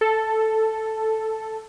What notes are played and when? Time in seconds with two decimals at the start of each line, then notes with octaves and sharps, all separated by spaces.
0.01 A4